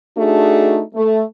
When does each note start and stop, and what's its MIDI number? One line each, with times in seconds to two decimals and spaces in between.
0.17 0.81 57
0.17 0.81 62
0.17 0.81 63
0.17 0.81 66
0.17 0.81 68
0.95 1.22 57